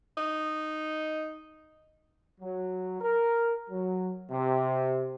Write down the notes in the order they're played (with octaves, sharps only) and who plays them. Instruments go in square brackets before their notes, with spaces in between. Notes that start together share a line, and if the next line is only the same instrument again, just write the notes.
[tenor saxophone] D#4
[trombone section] F#3
A#4
F#3
C3